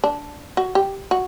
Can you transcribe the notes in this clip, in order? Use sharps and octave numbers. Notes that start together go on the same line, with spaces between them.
D4
F#4
G4
F#4